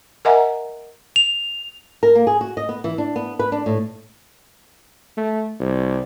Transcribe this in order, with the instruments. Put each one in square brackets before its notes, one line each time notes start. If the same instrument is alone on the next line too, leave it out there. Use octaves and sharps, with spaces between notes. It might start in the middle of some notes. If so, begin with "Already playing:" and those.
[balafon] A#4 D#5 E5 F#5 G#5 A#5
[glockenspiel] F7
[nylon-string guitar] A#4
A#3
G#4
F#4
D#5
B3
E3
D4
B3
B4
D4
A2
[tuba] A3
C2